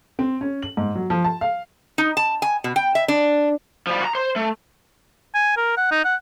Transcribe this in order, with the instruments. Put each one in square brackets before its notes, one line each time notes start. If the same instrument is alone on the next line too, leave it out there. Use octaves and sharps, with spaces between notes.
[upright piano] C4
C#4
F#7
G#2
F#3
F3
A5
F5
[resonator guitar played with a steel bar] D#4
A5
G#5
B2
G5
E5
D4
[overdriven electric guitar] F3 G3
F#4 A#5
C5
A3
[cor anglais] G#5
A#4
F#5
D#4
F#5